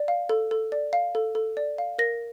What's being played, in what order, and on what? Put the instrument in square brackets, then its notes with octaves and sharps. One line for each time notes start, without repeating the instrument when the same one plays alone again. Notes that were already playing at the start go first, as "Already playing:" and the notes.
Already playing: [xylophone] D5
F5
A4
A4
D5
F5
A4
A4
D5
F5
A#4 A#6